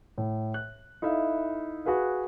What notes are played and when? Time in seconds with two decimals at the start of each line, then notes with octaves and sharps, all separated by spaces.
0.18 A2
0.54 F#6
1.02 D#4 E4 A4 E5 F5
1.86 F#4 G#4 B4 F5